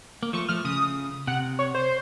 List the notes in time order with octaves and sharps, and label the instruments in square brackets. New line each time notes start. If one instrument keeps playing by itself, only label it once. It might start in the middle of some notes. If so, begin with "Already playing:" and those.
[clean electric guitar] A#3
[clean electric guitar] F3 A3 [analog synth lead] C#6
[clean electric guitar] F3 A3 [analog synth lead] F6
[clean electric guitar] C#3 [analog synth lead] D#6
[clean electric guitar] C3 [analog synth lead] F#5
[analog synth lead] C#5
C5